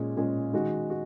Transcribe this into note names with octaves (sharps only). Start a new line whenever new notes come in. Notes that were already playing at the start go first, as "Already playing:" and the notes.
Already playing: A#2 G#3 C#4 G#4
A#2 G#3 C#4 G#4
D#3 G#3 F#4
F#4